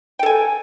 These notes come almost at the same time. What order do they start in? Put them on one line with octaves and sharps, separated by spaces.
G5 A4 G#5